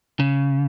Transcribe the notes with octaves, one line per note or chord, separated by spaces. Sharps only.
C#3